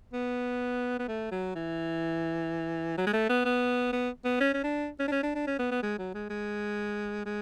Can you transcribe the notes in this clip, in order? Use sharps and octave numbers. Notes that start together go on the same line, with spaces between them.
B3
B3
A3
F#3
E3
F#3
G#3
A3
B3
B3
B3
B3
C#4
C#4
D4
C#4
D4
C#4
D4
D4
C#4
B3
B3
G#3
F#3
G#3
G#3
G#3